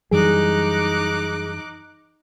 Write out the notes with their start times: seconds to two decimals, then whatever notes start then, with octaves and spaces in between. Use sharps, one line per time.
0.11 F#2 E3 G3 D#4 G#4 D6 F#6